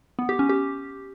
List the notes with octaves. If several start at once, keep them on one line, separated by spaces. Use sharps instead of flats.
B3
G4
C#4
G4